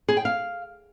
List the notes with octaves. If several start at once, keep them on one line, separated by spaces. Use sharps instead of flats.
G#4
G5
F5